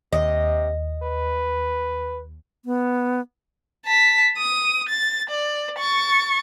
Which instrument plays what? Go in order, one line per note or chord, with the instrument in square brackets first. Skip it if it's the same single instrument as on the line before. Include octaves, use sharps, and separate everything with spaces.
[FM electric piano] D#2 [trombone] C3 [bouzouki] D#5
[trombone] B4
[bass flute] B3
[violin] A5 B6
D#6
A6
D5
C#6 A6